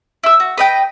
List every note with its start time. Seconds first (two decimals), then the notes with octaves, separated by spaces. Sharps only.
0.23 E4 E6
0.40 F#4
0.58 B4 D#5 G5